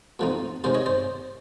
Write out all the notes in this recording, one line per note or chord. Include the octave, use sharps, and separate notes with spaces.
A#2 F3 A3 C4 D#4
C3 D#3 G#3 C#4 C5 D5
C#5 D#5
C5 D5